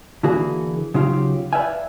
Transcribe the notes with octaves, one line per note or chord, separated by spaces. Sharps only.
D3 E3 A#3 F#4 G#4
C#3 F#3 D#4 F4 G4 F5
B4 D5 E5 F5 G5 G#5